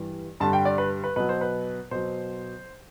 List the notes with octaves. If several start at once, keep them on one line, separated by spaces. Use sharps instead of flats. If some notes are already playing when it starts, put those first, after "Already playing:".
Already playing: G2 E3 G3
G2 D3 G3 A5
G5
D5
B4
B4
B2 F#3 B4
C5
B4
B2 F#3 C5